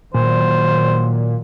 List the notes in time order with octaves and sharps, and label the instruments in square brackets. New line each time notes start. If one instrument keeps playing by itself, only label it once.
[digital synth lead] A#2 [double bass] D#3 F#3 [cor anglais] C5